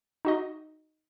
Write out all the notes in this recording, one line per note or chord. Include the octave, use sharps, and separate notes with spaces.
D#4 F#4 D#5